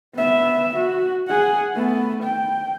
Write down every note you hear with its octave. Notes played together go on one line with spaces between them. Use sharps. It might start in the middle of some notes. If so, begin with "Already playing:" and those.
B3 E5
F#4
G#4 F#5
A3 B3
G5